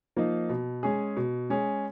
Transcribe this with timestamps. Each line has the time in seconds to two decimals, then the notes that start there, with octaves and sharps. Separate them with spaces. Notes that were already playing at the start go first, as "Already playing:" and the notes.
0.16 F3 A#3 D#4
0.49 B2
0.83 G#3 C#4 G#4
1.17 B2
1.50 G#3 C#4 G#4